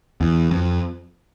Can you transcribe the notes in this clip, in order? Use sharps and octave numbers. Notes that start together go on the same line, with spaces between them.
E2
F2